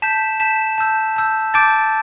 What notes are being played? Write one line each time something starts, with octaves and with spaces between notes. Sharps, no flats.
A5 G6 B6 E7
A5 G6 B6 E7
A5 E6 G6
A5 E6 G6
A5 D6 G6 A6 D7